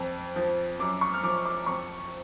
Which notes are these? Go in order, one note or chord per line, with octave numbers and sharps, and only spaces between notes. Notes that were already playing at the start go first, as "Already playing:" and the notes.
Already playing: F2
F3
F#2 D6
C#6
F6
F3 D6
D6
F2 C#6